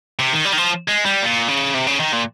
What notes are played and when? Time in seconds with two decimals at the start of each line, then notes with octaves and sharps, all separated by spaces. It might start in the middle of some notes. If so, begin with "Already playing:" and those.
0.19 C3
0.33 D#3
0.45 G3
0.53 D#3
0.58 F3
0.89 G#3
1.06 G3
1.23 A#2
1.49 C#3
1.75 C3
1.87 C#3
2.00 D#3
2.13 A#2